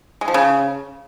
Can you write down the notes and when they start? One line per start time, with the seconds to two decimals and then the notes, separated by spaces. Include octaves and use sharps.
0.21 G#3
0.28 F3
0.34 C#3